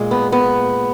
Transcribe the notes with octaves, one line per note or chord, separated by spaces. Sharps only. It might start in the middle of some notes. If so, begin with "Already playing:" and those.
Already playing: A#2 G#3
B3
B3